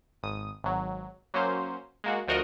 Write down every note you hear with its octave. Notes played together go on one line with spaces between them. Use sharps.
G#1 D#6
G#1 F#3
F#3 A#3 C#4 C5
G#3 A#3 F#4
D2 F3 F#4 A#4 D#5